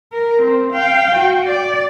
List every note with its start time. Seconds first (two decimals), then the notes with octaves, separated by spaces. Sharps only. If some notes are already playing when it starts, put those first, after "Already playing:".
0.13 A#4
0.42 C4
0.73 F5 G5
1.16 F#4
1.46 D5